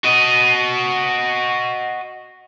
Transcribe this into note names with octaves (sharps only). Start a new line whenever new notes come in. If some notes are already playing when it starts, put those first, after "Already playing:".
F#4 D#5